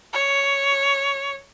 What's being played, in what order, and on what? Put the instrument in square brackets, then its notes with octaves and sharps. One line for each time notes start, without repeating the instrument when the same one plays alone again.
[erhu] C#5